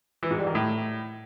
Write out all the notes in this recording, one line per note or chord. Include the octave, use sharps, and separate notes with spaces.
E3
G#2
G3
D#3
A2